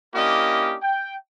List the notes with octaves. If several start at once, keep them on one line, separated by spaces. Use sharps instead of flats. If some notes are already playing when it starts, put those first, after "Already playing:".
A#3 C#4 D4 E4 G4 D#5
G5